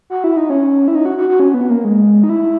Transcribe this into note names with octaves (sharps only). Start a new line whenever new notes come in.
F#4
E4
D#4
C#4
E4
D#4
F#4
F#4
F#4
C#4
B3
A#3
G#3
D#4
E4